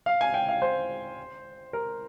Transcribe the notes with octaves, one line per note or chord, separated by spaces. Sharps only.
F5
G#5
G5
F5
C5
A#4